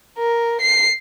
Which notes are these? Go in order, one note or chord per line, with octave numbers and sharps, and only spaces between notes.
A#4
C7